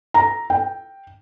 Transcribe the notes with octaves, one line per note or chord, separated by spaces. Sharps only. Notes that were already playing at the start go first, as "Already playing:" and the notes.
A#5
G5